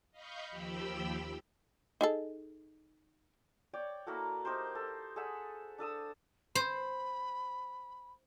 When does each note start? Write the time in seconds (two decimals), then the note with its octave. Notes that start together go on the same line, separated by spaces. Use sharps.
0.11 D#5 F5 B5 C#6 G6
0.50 D#2 F3 G4 G5 B5 E6
2.01 D#4 G#4 A4
3.73 C#5 D5 G5
4.06 A#3 E4 F#4 A4
4.45 D#4 G4 A#4 C5
4.75 A4
5.16 G#4 A4 E5 F#5
5.78 D4 A4 D#6 E6
6.55 C5 B5